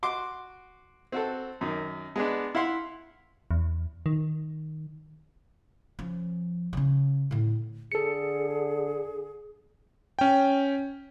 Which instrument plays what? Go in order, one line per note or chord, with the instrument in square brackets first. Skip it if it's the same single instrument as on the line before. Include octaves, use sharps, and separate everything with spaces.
[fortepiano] F#4 C6 D6
C4 F#4 A4
F#2 D#3
G#3 B3 D4
E4 F5 F#5 C6
[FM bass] E2
D#3
[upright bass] F3 C#4
C#3 C#4
A2 D3
[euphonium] D3 [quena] G#4 [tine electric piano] A4 C#7
[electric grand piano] C#4 G5